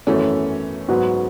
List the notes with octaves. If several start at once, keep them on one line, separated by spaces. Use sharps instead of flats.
G#1 F#2 E3 A3 B3 C#4 F#4
G#2 F#3 B3 F#4